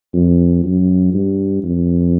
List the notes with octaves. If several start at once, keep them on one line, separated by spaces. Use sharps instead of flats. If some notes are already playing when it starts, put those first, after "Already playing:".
F2
F#2
G2
F2